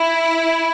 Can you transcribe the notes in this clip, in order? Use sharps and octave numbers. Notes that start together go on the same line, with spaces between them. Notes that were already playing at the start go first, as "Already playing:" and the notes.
Already playing: E4